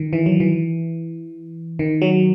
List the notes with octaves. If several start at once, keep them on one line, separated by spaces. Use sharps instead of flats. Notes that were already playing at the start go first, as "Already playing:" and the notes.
Already playing: D#3
E3
F#3
E3
D#3
F#3